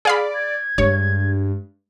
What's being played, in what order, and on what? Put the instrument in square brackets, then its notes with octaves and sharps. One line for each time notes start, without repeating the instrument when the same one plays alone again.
[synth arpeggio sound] G#4 F5 B5 [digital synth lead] D5
[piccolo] G#6
[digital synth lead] G2 [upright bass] G#3 [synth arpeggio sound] C#5